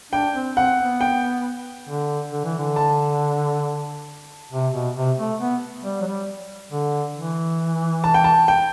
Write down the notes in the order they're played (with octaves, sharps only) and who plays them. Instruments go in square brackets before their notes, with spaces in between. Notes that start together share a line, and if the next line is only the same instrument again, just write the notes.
[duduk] D4 [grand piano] G5
[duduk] C4
[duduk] C4 [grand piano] F#5
[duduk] B3
[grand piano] G5
[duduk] D3
D3
E3
D3
[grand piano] A5
[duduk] C3
B2
C3
A3
B3
G3
F#3
G3
D3
E3
[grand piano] A5
G5
A5
G5